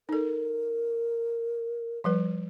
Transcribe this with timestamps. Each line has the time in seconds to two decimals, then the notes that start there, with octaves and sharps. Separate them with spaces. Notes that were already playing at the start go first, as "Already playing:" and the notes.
0.09 D#4 A4 A#4
2.04 F3 G3 B4